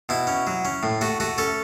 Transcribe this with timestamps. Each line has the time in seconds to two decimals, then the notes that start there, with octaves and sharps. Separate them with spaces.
0.09 B2 E4
0.27 C#4
0.47 F#3
0.65 C#4
0.83 A2
1.01 A3 F#4
1.20 A3 F#4
1.38 C#4 A4